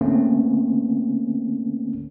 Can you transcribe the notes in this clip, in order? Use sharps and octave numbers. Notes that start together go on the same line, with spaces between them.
D3 A3 A#3 C4 C#4